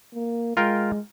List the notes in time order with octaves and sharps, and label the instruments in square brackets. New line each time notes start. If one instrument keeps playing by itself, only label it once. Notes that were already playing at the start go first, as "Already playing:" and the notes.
[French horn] A#3
[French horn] G#3 [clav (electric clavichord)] F4 A#4 G5